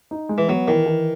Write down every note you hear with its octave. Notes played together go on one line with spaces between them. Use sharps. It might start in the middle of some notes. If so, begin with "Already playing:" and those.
D#4
G#3
E3
F#3 B3
D#3 E3
E3